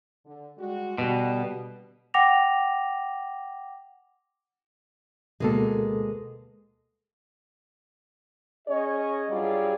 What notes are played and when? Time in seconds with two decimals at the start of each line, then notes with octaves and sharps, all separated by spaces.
0.25 D3
0.58 G3 G#3 F#4
0.98 B2 D3 G3
2.14 F#5 G5 D6 A#6 F7
5.40 D2 B2 G#3 A#3 B3 A4
8.68 C#4 G#4 C#5 D#5
9.30 G2 F#3 G3 F4 G#4 D5